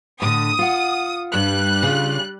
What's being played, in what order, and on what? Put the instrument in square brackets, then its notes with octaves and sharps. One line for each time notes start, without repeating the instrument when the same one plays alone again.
[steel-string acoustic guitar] A2 D3 [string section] D#6
[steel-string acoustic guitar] F4 F#5
[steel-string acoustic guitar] G2 [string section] G3 F#6
[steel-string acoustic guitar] C#3 F4